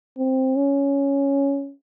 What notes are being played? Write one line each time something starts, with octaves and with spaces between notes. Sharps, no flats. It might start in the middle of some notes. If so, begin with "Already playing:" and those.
C4
C#4